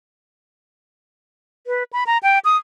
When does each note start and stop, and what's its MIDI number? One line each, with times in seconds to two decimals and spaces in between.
1.67 1.84 71
1.93 2.04 83
2.07 2.18 82
2.23 2.39 79
2.45 2.57 87